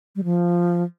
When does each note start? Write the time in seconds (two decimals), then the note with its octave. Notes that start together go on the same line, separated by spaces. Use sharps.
0.16 G3
0.24 F3